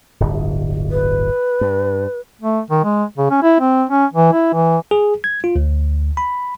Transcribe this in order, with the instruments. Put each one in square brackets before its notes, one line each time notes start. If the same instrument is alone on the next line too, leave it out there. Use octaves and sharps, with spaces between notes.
[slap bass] D1 G1
[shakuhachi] B4
[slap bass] G2
[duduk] A3
D#3
G#3
C#3
C#4
E4
C4
C#4
E3
E4
E3
[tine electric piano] G#4
G#6
F4
D2
B5